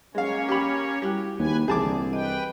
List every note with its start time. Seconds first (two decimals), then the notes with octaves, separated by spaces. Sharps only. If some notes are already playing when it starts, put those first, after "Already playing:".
0.15 G#3 A#3 C#4 C#5 F5
0.49 G4 B5
1.02 G3 E4 F#4 G4
1.39 D#2 B4 G#5
1.68 C2 D3 E3 G#4 A5 D6
2.13 B4 D#5 G5